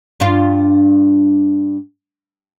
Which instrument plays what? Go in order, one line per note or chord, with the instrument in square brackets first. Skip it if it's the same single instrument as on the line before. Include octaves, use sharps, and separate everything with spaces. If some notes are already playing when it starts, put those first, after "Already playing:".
[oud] G2 D4 F4